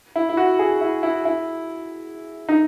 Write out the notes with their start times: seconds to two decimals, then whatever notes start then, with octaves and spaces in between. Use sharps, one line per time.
0.16 E4
0.29 E4
0.37 F#4
0.59 G#4
0.81 E4
1.03 E4
1.25 E4
2.49 D#4